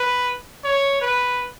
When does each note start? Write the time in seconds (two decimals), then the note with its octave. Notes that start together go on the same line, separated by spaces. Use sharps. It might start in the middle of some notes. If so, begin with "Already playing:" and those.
Already playing: B4
0.64 C#5
1.01 B4